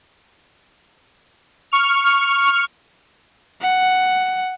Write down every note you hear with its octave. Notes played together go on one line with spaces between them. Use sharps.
C#6 F6
F#5